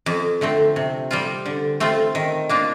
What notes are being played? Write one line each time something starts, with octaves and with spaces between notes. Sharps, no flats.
F2
D3 A3 C4
C3
G3 C4 F4
D3
A3 C4 F4
D#3
A#3 D4 F4